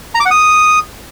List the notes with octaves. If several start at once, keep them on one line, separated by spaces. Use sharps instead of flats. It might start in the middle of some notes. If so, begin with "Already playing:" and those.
A#5
D6
F#5
D#6